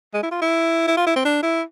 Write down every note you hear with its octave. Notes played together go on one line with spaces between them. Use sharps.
G#3
E4
F4
E4
E4
F4
E4
C4
D4
E4